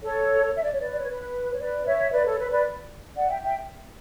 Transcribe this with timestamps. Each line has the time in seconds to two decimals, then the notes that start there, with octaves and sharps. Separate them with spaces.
0.03 A4 C#5
0.56 E5
0.64 D5
0.73 C#5
0.80 B4 D5
0.91 D5
1.00 C#5
1.08 B4
1.54 C#5
1.60 B4 D5
1.86 C#5 E5
2.12 B4 D5
2.26 A4 C#5
2.39 B4
2.51 B4 D5
3.16 D5 F#5
3.30 E5 G5
3.43 E5 G5